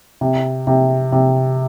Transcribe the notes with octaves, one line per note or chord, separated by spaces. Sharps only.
C3
C3
C3